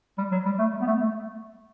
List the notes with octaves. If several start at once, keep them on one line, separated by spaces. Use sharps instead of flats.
G3
F#3
G3
A3
G3
B3
A3
A3